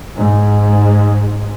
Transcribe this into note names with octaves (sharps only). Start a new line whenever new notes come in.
G#2